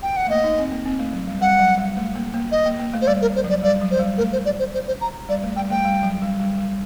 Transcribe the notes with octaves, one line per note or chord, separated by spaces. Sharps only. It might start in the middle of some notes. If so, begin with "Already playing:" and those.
G5
F#5
A3
A#3 D#5
D#4
C4
A#3
C4
A3
F#3
G3
G3 F#5
F#3
G3
A3
A#3
A#3
D#5
A#3
A#3
A3
C5
G3 D5
A#4
C5
F#3
D5
G3 D5
F#3
C5
G3
A3 A#4
C5
D5
C5
C5
C5
A#5
G3 D5
A3
G3 G5
A3 G5
G3
F#3
G3
G3
G3